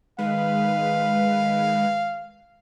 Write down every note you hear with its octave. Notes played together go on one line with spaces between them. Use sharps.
D#3 G#3 B4 F5